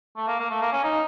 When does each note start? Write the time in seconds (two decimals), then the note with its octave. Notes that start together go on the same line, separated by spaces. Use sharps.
0.17 A3
0.28 A#3
0.39 A#3
0.50 A3
0.62 A#3
0.72 C#4
0.84 D#4